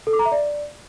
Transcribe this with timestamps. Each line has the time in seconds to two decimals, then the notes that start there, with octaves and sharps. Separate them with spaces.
0.07 A4
0.13 D6
0.19 A#5
0.26 E5
0.32 D5